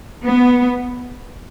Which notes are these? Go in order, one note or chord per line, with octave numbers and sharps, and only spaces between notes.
B3